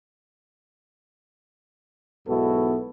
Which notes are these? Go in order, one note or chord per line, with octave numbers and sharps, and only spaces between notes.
B1 G#2 B3 E4 F#4 A4